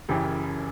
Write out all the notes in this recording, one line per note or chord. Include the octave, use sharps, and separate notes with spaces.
F#1 F#2 C#3 E3 G4